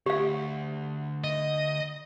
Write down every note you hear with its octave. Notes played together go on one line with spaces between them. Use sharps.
D2 G4 F5
D#5